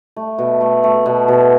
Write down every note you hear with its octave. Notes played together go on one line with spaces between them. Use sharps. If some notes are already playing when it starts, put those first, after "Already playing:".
A3
B2
A3
A3
B2
B2